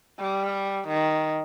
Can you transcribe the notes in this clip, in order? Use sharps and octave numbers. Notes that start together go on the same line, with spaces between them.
G3
D#3